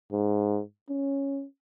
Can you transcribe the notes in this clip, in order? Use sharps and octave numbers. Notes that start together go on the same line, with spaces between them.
G#2
C#4